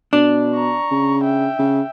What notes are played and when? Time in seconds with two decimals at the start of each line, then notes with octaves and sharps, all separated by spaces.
0.13 B2 D4
0.55 A#5 C#6
0.91 C#3
1.24 E5 G5
1.59 C#3